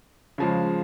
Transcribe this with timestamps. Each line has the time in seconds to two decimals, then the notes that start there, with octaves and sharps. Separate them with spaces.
0.38 C#3 F3 G#3